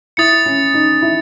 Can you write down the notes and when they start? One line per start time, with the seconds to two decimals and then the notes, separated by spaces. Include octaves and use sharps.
0.17 E4 D#6 A6 C#7
0.46 C#4
0.74 D#4
1.02 E4